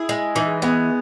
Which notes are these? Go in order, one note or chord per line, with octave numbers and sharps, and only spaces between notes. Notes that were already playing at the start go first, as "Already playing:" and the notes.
Already playing: E4 G#4
G#3
E3 D#4
G#3 B3